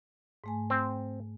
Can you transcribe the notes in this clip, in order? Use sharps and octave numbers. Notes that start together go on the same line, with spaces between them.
G#2 A3 G#5
C4